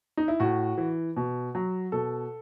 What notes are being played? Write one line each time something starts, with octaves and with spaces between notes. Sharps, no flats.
D#4
E4
A2 F#4
E3
B2
F#3
B2 A4